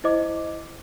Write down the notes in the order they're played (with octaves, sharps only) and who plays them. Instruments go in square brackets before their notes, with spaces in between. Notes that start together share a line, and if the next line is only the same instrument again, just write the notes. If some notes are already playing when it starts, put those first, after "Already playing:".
[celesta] E4 C5 D#5 D6